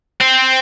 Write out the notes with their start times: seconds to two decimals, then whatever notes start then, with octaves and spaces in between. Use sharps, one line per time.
0.20 C4